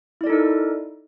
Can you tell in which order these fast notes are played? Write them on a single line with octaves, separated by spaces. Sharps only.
E4 D5 A4 D#4 A#4